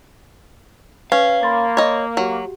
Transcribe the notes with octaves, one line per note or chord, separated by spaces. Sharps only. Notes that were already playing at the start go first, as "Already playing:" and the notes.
C#4 B4 F5
A#3 B5 C6 A6
C#5 D#5
F#3 F#4 G4